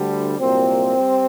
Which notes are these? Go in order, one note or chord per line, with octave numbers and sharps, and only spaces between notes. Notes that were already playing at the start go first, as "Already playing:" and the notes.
Already playing: D2 D3 G3
C2 A#2 F#3 A#3 C4
G3